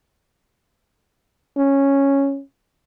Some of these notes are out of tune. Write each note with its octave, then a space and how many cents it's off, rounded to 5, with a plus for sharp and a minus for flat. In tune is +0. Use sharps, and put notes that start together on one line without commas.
C#4 -5